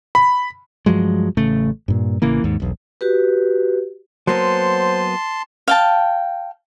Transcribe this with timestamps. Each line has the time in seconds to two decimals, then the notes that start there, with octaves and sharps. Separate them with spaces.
0.15 B5
0.86 G2 F3 F#3 G#3
1.37 A1 C#3 A3
1.88 G2 A#2
2.22 A1 C#3 E3 A#3
2.44 D#2 G#2
2.60 E1 B1
3.01 F#4 G4 B4
4.27 F#3 A#3 B3 C5 A5 C6
5.68 F5 G5 A5